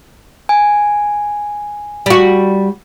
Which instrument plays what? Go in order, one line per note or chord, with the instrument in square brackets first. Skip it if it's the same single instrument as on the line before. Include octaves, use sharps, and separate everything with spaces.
[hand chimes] G#5
[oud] G3 F#4